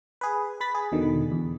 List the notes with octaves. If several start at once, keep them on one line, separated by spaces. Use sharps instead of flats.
G#4 B4
B4 B5 A6 B6
G#4
E2 B2 D3 D#3
E2